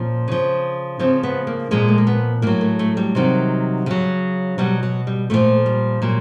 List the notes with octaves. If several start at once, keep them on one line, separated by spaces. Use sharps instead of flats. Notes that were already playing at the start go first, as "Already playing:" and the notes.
Already playing: A#2 F3 C#4
C#3 F3
C#3 F3 C4
B3
A#3
A#2 F3 G#3
A3
A#3
B3
A2 F#3 A#3
A3
A3
G3
C3 D#3 F#3
C#3 F#3
B2 F#3 G3
F#3
G3
A#2 F3 A3
G3
A#2 F#3